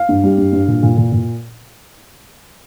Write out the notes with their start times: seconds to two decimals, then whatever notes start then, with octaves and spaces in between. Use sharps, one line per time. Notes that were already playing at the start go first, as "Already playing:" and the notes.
Already playing: F5
0.09 G2
0.24 G3
0.38 G2
0.53 G2
0.68 A#2
0.83 A#2
0.97 A#2
1.12 A#2